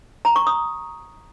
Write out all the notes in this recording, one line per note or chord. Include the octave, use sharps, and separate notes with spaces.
A#5
C#6
D#6